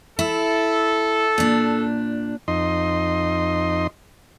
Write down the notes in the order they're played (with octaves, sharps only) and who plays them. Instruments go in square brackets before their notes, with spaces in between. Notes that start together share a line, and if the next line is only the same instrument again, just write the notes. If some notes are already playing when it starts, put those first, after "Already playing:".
[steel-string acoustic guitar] E4 [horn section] A4
[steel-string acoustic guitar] A#2 D4
[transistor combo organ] F2 D#4 D#5 C6